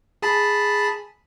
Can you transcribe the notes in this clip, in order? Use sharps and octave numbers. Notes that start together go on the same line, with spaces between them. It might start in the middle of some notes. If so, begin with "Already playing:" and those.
G#4 A5 B5